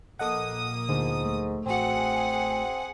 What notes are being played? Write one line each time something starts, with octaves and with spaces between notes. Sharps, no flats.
A#1 A#3 A4 D#5 F#5 D#6
D2 G#2 D3 F3
A3
A1 C4 F#4 G#4 F#5